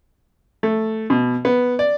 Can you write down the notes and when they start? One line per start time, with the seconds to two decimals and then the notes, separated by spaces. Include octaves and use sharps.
0.63 A3
1.10 B2
1.45 B3
1.79 D5